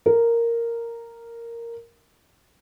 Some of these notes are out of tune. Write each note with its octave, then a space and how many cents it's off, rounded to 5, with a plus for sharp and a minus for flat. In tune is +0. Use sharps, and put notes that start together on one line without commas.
A#4 -5